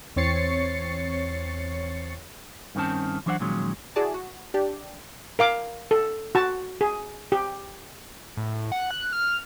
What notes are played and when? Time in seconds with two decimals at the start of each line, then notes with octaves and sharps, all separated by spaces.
0.16 E2 C4 C#5 A6 C7 C#7
2.75 G2 D#3 C4 C#4 A5
3.26 E3 F#3 D4 C5 D#5 F#5
3.40 A#2 D#3 F3 F#3 G#3 C#4
3.96 E4 F#4 G#4 D5 A5
4.14 F#4
4.54 D4 G4 D5
5.39 A#4 F5 D6
5.91 A4
6.35 F#4 A5
6.81 G#4
7.32 G4
8.37 A2
8.72 F#5
8.91 F#6
9.13 F6